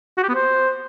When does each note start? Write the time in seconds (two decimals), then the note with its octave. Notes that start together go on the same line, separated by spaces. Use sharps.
0.17 F#4
0.23 G4
0.29 B3
0.35 C5